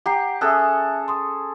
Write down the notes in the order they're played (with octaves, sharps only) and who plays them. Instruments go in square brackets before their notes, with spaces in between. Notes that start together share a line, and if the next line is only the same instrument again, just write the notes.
[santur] G4 [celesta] F#5 A#5 C7
[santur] C#4 G#4 A4 [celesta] E5 D#6 F#6
[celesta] C6 D#6